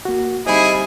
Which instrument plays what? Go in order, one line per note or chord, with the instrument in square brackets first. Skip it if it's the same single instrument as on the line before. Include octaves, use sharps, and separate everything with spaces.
[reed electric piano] A#3 F#4
[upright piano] G3 C4 D#4 [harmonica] E4 G#4 [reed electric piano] D#5 B5